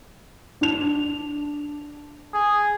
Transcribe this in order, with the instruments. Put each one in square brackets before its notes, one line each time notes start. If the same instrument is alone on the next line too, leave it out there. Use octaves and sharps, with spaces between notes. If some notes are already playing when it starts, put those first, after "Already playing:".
[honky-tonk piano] D4 F7
[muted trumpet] G#4